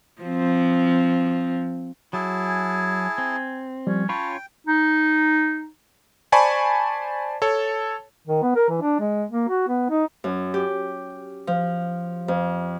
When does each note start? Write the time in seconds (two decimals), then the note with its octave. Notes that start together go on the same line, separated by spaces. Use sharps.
0.22 F3 C4
2.13 F#3 E4 G#4 A5
2.47 G#5
3.18 C4
3.87 F3 G3 C#4
4.09 C#4 F4 C#5 G5 A5 B5
4.67 D#4
6.32 C5 D5 G#5 A5 B5 C#6
7.42 A4 C#5 A5
8.27 D#3
8.43 B3
8.56 A#4
8.69 E3
8.82 D4
8.99 G#3
9.30 A#3
9.49 F#4
9.68 B3
9.90 D#4
10.24 F#2
10.54 G4
11.47 F3
12.28 F2